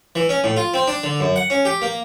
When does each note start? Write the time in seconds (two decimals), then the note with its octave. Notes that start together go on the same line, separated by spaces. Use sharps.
0.15 E3
0.29 C#4
0.44 A2
0.57 F4
0.74 C4
0.87 D4
1.04 D3
1.20 F#2
1.36 F#5
1.50 C#4
1.65 G4
1.82 A#3